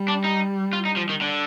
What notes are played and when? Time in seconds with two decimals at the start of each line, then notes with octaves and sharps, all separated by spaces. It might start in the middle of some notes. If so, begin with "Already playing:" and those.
Already playing: G3
0.08 D4
0.24 D#4
0.73 F4
0.85 D#4
0.97 F3
1.09 D#3
1.21 D3